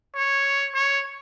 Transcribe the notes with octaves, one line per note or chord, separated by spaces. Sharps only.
C#5
C#5